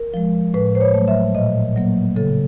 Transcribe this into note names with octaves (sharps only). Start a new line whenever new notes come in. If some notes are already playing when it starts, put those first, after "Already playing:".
Already playing: A#4
F3 G#3
A2 B4
C5
C#5
F#3 A3
E5
A#2 D#5
F#3 A#3
C#3 A4